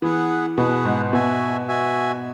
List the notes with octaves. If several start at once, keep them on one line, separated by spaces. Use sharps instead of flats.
E3 B3 G#4 B4 F#5
B2 B3 G#4 B4 F#5
G#2
B2 F#4 E5 G#5
F#4 E5 G#5